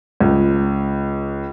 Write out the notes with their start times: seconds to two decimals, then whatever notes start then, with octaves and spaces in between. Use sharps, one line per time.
0.21 C#2